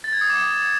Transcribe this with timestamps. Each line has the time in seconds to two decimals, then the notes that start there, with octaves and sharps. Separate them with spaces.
0.04 A6
0.13 G#6
0.21 D#6
0.30 D6
0.38 D#6